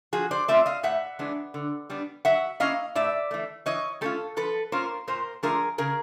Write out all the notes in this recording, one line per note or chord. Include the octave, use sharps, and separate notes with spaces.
F3 F#4 G#4
C5 D5
A3 C4 F4 D5 E5
D#5 F5
A2 E5 F#5
E3 G#3 B3 D4
D3
G3 B3 D4
F#3 E5 F#5
A#3 C#4 E4 D#5 F5
A2 D5 E5
E3 A3
E3 C#5 D#5
A3 C#4 F4 G4 A4
F3 A4 B4
A#3 C#4 F4 A#4 C5
A#2 A#4 C5
F3 A3 D4 F4 G#4 A#4
C#3 G#4 A#4